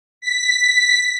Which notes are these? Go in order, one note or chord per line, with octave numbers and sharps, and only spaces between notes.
B6